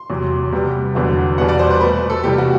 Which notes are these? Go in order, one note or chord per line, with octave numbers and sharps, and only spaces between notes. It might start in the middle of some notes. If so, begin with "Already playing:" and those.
Already playing: C6
E2 C3 F#3
C3 G3 B3
E2 D3 F#3 B3
E2 B2 G3 B3 F#5
D5
C5
B4
B2 A3 B4
A4
C3 E3 G3 G4
F#4